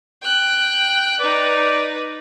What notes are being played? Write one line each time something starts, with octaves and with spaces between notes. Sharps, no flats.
G5 F#6
D#4 B4 D5